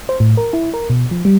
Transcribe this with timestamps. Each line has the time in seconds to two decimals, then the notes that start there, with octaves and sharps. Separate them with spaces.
0.09 C5
0.20 A2
0.37 A#4
0.53 E4
0.74 A#4
0.90 B2
1.11 F3
1.25 G3